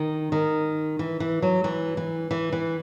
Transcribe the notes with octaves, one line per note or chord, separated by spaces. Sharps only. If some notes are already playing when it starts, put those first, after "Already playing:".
Already playing: D#3
D#3
E3
E3
F#3
E3
E3
E3
E3